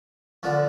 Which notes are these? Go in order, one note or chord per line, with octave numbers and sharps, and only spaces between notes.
D3 F3